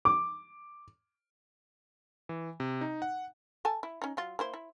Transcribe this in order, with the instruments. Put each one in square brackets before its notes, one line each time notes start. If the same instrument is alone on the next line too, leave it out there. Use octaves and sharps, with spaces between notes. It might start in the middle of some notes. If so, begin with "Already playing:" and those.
[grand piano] D6
[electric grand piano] E3
C3
D#4
F#5
[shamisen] A4 G#5 A5
E4
C#4 D#4
F#3 F4
A#3 E4 C5
E4